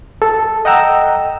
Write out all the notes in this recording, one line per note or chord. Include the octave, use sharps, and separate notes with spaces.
A4
D#5 F#5 G5 A#5 E6